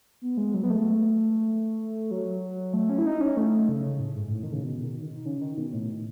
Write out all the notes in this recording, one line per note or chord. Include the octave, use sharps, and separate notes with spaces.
B3
G#3
F#3
B3
A3
F#3
A3
C#4
E4
D#4
C#4
A3
C#3
A2
G#2
G#2
A2
D#3
C#3
B2
D#3
D#3
C#3
D#3
B2
A2